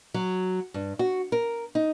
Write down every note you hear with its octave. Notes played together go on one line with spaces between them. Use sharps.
F#3
G2
F#4
A#4
D#4